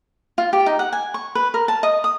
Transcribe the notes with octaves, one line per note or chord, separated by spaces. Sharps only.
F4
G4
D#4
F#5
G#5
C#6
B4
A#4
A5
D#5
D#6